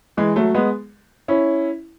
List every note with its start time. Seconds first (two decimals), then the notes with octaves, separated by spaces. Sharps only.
0.17 E3 G#3
0.36 F#3 A3
0.54 G#3 B3
1.28 C#4 E4